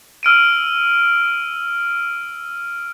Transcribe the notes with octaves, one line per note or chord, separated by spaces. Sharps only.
E6 F6 D7 D#7